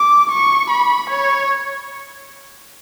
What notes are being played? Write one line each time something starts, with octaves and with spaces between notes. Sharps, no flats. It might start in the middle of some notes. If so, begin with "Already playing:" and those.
Already playing: D6
C#6
B5
C#5